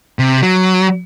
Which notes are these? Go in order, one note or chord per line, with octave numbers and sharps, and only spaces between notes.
C3
F#3